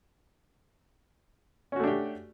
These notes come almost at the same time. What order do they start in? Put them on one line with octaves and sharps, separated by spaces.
C#4 F#4 A3 D4 G4